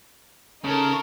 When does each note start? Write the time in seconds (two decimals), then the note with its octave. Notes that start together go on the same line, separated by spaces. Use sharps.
0.64 C#3 D#4 A4 A#4